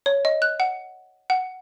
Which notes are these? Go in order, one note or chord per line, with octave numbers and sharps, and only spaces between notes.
C#5
D#5
F#6
F#5
F#5